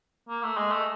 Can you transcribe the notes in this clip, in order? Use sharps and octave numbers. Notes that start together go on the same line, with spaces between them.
A#3
A3
G#3
A3